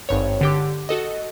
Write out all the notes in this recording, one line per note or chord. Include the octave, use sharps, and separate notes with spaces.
G#1 G2 C#5
D3 G4 D6
F#4 A4 D#5